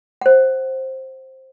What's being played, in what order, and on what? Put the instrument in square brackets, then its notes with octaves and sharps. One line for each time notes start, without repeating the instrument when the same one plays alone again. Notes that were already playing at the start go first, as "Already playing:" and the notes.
[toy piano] C5 F#5